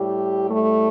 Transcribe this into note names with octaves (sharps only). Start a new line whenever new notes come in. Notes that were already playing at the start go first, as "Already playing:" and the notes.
Already playing: A2 G3 G4
A3